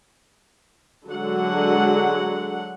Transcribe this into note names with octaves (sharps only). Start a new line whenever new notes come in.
D3 F#3 G#3 F#5